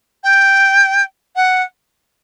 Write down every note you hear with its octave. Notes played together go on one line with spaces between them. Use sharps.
G5
F#5